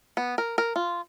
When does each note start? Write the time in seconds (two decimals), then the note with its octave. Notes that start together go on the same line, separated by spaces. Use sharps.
0.17 B3
0.38 A#4
0.58 A#4
0.76 F4